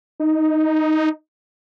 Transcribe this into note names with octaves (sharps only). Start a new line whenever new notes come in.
D#4